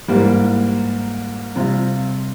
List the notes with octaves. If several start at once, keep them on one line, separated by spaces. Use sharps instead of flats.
G#2 E3 G3 A#3
C3 G3 C4 F4